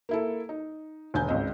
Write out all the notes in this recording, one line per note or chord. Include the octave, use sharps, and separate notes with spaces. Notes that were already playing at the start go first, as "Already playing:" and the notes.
A#3 E4 A4
D#4
E1 D3 G#5 G6
G#1 C#2 C4 D#5